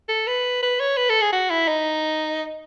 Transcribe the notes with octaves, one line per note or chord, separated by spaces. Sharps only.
A4
B4
B4
C#5
B4
A4
G#4
F#4
E4
D#4